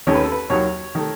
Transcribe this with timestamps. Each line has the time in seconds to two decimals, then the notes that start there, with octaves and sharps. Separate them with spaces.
0.07 D#2 D#3 A3 C#4 C#5
0.15 B4
0.24 A4
0.32 B4
0.50 D#2 D#3 F#3 C#5
0.95 D#3 A3